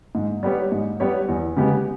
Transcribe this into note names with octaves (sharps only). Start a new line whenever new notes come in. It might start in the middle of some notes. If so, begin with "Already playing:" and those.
G#2
G3 B3 G4 C#5
G#2
G3 B3 G4 C#5
E2
C#3 G#3 B3 G4